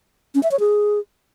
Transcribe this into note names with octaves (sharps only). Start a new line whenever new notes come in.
C#4
E5
C#5
G#4